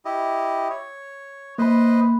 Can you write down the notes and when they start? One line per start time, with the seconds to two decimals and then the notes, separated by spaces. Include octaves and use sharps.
0.05 E4 G4 D#5
0.70 C#5
1.58 A#3 B4 C5 D#5 B5